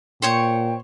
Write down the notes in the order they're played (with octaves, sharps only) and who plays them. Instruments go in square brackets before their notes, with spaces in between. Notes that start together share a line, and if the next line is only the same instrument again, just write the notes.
[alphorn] A#2 [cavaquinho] C5 C#5 C#6 [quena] G5